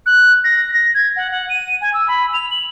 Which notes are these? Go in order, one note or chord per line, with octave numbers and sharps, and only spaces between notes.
F#6
A#6
A#6
G#6
F#5
F#5
D#7
G#5
E6
B5
F7
F#7